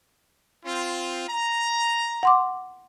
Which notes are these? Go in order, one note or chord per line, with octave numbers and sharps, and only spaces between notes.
C4 F4
A#5
F#5 C6 D6